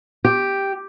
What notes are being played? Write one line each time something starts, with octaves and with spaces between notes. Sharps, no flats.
G4